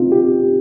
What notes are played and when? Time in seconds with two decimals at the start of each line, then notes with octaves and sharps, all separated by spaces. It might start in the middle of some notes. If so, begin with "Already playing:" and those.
Already playing: C4 D#4 F4
0.12 G4